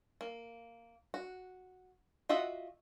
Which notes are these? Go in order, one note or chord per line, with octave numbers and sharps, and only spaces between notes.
A#3
F#4
F4 F#4 D#5 E5 F#5